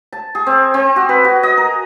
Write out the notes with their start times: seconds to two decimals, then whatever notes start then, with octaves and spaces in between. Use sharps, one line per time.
0.13 A5
0.35 G#4
0.46 C4
0.74 C4
0.96 F#4
1.09 B4
1.24 F#4
1.43 D#5
1.57 A#4